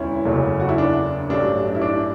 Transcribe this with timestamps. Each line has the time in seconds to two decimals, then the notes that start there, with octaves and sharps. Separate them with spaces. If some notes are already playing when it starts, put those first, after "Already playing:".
Already playing: E1 D2 C#4 E4
0.25 F#1 E2 C#3 F#3 A3
0.60 F#4
0.69 E4
0.78 D4
1.29 A1 G2 F#3 A3 D4
1.75 E4
1.82 D4